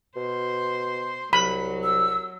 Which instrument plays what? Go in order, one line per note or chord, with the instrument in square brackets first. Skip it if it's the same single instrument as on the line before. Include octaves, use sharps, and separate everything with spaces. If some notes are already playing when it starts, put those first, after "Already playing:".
[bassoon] B2 [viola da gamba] C5
[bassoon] C2 [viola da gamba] F#3 [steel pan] B5
[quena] E6